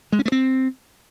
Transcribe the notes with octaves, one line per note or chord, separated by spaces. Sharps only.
G#3
C#4
A3
C4